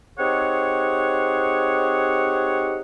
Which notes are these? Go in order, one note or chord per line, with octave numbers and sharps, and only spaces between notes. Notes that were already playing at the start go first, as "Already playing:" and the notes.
C4 D#4 G4 G#4 C#5 F#5